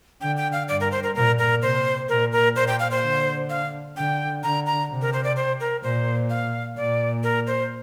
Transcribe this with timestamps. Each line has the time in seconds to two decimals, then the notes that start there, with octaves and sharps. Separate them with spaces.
0.21 D3 G5
0.37 G5
0.52 F5
0.68 G2 D5
0.80 A#4
0.92 C5
1.03 A#4
1.15 A#2 A#4
1.39 A#4
1.62 C3 C5
2.09 A#2 A#4
2.32 A#4
2.55 A#2 C5
2.68 G5
2.79 F5
2.91 C5
3.02 D3
3.50 F5
3.96 D3 G5
4.43 D3 A#5
4.66 A#5
4.90 C3
5.02 A#4
5.13 C5
5.24 D5
5.36 C5
5.60 A#4
5.83 A#2 C5
6.30 F5
6.77 A#2 D5
7.23 A#4
7.47 C5